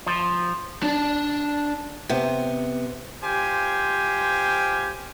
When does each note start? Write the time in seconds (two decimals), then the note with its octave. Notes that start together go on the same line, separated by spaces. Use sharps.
0.07 F3
0.83 D4 A5
2.09 C3 B3
3.23 F4 G4 C5 G#5